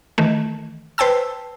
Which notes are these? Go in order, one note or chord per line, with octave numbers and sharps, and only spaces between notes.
D#3 E3 A3
B4 C5 G5 A5 E6